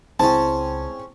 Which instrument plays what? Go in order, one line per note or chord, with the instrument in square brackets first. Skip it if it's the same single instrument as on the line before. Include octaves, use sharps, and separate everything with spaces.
[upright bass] C#2 [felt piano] C4 E4 G5 [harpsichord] C#4 G#4 C5 [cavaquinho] A5